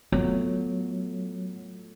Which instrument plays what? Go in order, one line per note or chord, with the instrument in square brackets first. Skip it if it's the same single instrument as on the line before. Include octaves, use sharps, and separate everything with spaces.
[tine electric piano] F#3 [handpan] A3 F4 [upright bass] B3